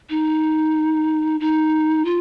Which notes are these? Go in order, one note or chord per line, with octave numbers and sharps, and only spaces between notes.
D#4
D#4
F4